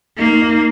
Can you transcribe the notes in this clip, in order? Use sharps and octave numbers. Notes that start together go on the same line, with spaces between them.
A#3 D#4
D#4